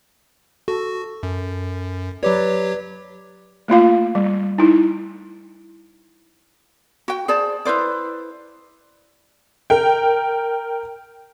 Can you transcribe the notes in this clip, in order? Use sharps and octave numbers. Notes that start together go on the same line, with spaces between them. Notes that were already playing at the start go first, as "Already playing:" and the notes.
F#4 A4
F#2
F#3 G4 B4 C#5 D5
A3 A#3 F4 F5
G3
D#4 E4
F#4 G5
G#4 C5 D5 A5
E4 B4 C5 D5
A#4 G5